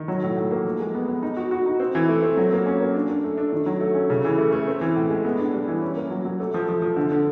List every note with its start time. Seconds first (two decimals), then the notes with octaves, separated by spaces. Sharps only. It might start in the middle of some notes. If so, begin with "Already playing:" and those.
Already playing: D#3
0.08 F#3
0.22 A2
0.37 A2
0.51 A#3
0.65 F3
0.80 G#3
0.94 B3
1.08 B3
1.23 D#4
1.37 F#4
1.51 F#4
1.66 D#4
1.80 C4
1.95 E3
2.09 A3
2.22 C4
2.37 F#3
2.52 A#3
2.66 C#4
2.81 A#3
2.94 D4
3.09 D4
3.24 A3
3.37 D4
3.52 D#3
3.66 F#3
3.80 A3
3.95 C#4
4.10 C#3
4.25 E3
4.38 A3
4.52 A3
4.67 C4
4.81 E3
4.96 A2
5.10 G#3
5.25 B3
5.38 D4
5.53 G3
5.68 E3
5.82 C#4
5.96 A#3
6.10 F#3
6.25 F#3
6.40 A3
6.54 F3
6.69 F3
6.82 F3
6.97 D3
7.11 D3